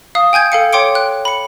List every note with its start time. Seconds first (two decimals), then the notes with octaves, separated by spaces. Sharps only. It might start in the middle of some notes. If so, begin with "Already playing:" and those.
0.15 F5 D#6
0.33 G5 G#5 G6 G#6
0.52 A4 F5 C#7
0.73 C#5 G5 C6 D6 C#7 D7
0.95 F#6
1.25 B5 C#7